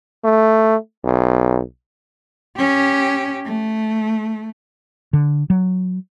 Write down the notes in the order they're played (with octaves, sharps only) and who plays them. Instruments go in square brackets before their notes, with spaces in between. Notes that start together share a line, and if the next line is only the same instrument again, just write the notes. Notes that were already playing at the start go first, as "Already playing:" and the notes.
[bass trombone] A3
B1
[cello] C#4 G4
A3
[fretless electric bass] D3
F#3